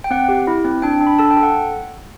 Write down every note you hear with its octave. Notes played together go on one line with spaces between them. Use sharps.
G5
C4 F#5
G4
E4
C4
D4 G5
D4
B5
A4 A5
G5
A4
F#5